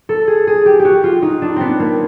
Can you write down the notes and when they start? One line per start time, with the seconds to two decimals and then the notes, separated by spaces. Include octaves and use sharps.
0.09 A4
0.27 G#4
0.47 G#4
0.66 G4
0.79 G4
0.85 F#4
1.04 F4
1.22 D#4
1.42 D4
1.56 B3 C4
1.80 A#3